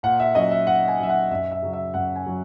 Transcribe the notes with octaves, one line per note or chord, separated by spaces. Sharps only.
A#2 F#5
E5
F#3 C#4 D#5
E5
A#2 F#5
G#5
F#3 C#4 E5
F#5
F#2 E5
E5
C#3 F#3
E5
F#2 F#5
G#5
F#3